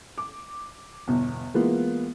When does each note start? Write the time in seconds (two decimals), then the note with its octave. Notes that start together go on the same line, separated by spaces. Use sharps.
0.18 D6
1.08 G1 E2 B2
1.54 E3 G#3 A#3 B3 F4